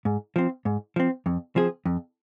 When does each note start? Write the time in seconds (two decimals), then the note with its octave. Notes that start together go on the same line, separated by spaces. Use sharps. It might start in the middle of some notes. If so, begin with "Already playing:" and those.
0.05 G#2
0.36 F3 C4
0.65 G#2
0.96 F3 C4
1.26 F2
1.56 F3 C4 G#4
1.85 F2